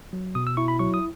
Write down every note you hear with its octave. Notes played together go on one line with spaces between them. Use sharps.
F#3
B2 D#6
E6
E4 C#6
B5
F#3 C#6
D#6